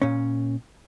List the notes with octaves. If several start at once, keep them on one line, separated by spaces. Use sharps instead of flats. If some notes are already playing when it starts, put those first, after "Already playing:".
A#2 C#4